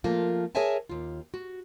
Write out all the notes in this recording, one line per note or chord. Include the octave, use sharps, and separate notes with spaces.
F3 A3 A#3 F4
G#4 A#4 C#5 E5 G#5 A5
D#2 F4
F#4